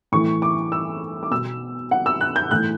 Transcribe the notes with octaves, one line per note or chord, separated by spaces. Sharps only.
A2 E3 C#6
D6
E6
D6
B2 E6
F#5
E6
F#6
G6
A2 E3 F#6